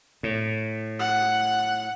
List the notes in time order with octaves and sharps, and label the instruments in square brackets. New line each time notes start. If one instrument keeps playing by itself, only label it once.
[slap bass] A2
[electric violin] F#5